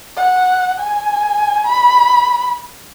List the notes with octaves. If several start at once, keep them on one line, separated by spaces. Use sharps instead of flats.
F#5
G#5
B5